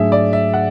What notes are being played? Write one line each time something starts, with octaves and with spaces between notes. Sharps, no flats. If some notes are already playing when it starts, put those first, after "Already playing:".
Already playing: G#2 F#3 A3 D4 G#4 E5
D5
E5
F#5